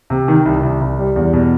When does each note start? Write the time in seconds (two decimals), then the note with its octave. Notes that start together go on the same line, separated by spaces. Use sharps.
0.10 C3
0.28 D#3
0.45 C2
0.63 C2
0.81 C2
0.99 G3
1.16 E2
1.33 B2